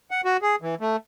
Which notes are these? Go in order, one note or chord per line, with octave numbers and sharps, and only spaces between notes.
F#5
F#4
G#4
E3
A3